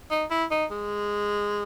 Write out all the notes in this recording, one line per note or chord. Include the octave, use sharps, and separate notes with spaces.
D#4
E4
D#4
G#3